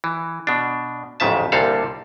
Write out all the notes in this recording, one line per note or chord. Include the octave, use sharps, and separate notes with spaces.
E3
B2 D4
A1 F2 G#2 C#3 E5 A5
C2 A#2 D3 G3 A4 F5